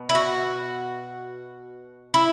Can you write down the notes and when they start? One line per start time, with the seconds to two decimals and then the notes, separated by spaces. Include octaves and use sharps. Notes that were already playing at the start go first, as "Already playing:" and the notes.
Already playing: B2
0.09 E4
0.15 F#4
2.14 E4